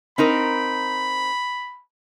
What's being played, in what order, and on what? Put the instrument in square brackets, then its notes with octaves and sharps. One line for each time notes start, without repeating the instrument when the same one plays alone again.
[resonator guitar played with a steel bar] C4 D#4 A#4 [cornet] B5